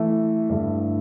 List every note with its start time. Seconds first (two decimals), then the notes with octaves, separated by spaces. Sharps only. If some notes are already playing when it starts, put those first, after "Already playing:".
Already playing: E3 A3 E4
0.49 G2 D3 A3 E4